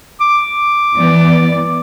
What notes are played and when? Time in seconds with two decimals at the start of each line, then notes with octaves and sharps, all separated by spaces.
0.21 D6
0.95 E3 B3 D5